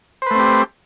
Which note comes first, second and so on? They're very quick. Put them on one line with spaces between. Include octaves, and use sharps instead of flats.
C5 B4 A3 C4 G4